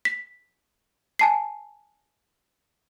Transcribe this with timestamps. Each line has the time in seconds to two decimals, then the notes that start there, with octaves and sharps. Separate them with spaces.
0.05 B6
1.19 G#5 A5 C7